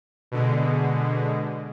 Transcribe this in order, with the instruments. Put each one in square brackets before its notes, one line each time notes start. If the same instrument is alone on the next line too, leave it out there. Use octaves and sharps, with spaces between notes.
[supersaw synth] B2 D3 G#3